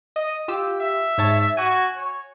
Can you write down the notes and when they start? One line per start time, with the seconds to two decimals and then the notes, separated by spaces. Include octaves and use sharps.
0.16 D#5 D#7
0.48 F4 G4 E6
0.80 E5
1.18 G#2 C#5 A5
1.57 F#4 G#5
1.96 C#5